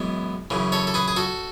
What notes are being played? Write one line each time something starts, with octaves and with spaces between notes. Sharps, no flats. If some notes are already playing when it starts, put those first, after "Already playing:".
Already playing: F#2 E3 G#3 B3
F#2 C#3 E3
A4 C#5
A4
G#4 B4
G#4
F#4 A4